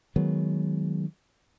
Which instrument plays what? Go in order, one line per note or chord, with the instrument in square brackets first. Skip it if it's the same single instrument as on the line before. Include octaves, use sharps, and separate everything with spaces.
[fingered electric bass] D#3 F#3 G#3 B3